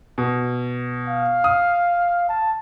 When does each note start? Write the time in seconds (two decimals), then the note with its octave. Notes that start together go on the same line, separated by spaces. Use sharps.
0.18 B2
1.08 F5
1.44 D#6
2.29 A5